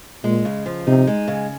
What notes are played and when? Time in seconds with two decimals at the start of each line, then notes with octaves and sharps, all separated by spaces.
0.24 A#2 G#3
0.45 C#3
0.66 F3
0.87 C3 D#4
1.07 G#3
1.28 C#3